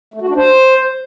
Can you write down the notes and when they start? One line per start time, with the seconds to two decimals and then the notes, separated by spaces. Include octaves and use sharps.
0.14 A3
0.21 F#4
0.29 D4
0.37 C5